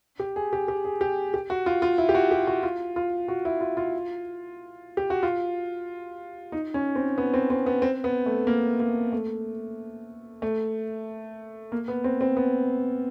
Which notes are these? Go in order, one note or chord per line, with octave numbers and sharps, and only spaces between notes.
G4
G#4
G4
G4
G#4
G4
G4
F#4
F4
F4
E4
G4
F#4
G4
F#4
F4
F4
F#4
E4
F4
F4
G4
F#4
F4
D#4
C#4
C4
B3
C4
C4
B3
C4
B3
A3
A#3
A#3
A3
A3
A#3
B3
C4
C4
B3